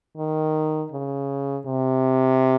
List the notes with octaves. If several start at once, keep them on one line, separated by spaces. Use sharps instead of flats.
D#3
C#3
C3